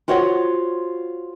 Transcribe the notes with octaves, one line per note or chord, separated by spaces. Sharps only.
F4 F#4 C5 C#5 F5 F#5